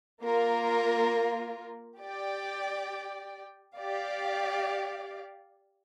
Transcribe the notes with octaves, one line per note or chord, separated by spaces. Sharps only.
A#3 F4 A#4
G4 D5 G5
G4 D5 F5